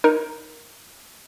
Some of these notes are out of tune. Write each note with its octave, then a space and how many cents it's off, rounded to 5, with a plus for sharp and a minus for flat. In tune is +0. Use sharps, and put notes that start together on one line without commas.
D#4 +0 A#4 +10